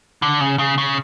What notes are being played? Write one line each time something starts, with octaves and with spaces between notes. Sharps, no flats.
D3
C#3
C#3
C#3